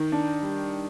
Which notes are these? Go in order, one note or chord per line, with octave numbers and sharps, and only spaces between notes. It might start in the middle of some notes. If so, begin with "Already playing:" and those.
Already playing: D#3
D4
G3